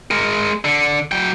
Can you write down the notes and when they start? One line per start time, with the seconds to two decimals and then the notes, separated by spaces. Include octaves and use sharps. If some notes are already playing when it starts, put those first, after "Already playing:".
0.11 G#3 A#4
0.65 D3
1.12 F#3 G5